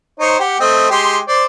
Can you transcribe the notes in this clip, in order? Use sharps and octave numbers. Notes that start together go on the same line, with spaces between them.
D#4 C5 C#5
G4 F#5
A3 C4 D#5
G#3 G4 C6
C5 D5